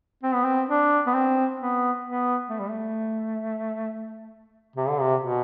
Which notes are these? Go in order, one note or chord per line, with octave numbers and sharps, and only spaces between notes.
C4
B3
C4
D4
B3
C4
B3
B3
A3
G3
A3
C3
D3
C3
B2